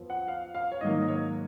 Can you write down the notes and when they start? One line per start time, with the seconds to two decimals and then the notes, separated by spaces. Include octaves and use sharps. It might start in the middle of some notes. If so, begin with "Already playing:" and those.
Already playing: F2 F3 B3
0.10 F#5
0.28 F5
0.54 F5
0.72 C#5
0.81 G#2 D#3 F#3 A#3 D#5
1.03 D#5
1.08 C#5